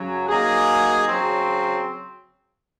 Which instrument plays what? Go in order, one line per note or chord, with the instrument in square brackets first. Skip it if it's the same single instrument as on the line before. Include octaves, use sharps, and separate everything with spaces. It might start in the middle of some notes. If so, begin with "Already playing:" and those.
Already playing: [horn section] F#2 C#3 F#3
F#3 A#3 D#4 G#4
C#3 F#3 C4